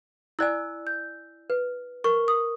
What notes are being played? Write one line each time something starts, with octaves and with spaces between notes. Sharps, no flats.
E4 D5 G#5 E6 F#6
G6
B4
A#4 C#6
D#6